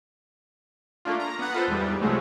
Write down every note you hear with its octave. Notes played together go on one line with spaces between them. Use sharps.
A3 A#3 D4 F4
A#5
B3 F#5
F4 A4 B4 C5
E2 G#2 G3
C2 C3 F3 F#3 G#3 A3